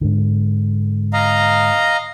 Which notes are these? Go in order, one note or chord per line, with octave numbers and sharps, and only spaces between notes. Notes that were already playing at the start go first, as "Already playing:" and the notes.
G#2 D3
D#5 F5 A#5